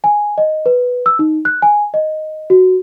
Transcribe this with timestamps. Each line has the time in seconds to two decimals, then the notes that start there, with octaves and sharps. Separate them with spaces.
0.04 G#5
0.38 D#5
0.66 B4
1.06 E6
1.19 D#4
1.45 F#6
1.62 G#5
1.94 D#5
2.50 F#4